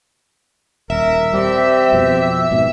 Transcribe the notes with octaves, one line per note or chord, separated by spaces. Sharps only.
D#1 A#4 E5
G3 C4 G4
F2 B2 F3
G#2 B2